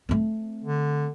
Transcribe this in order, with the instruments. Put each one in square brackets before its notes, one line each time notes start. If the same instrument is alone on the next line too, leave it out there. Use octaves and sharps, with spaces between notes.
[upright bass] A3 C4
[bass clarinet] D3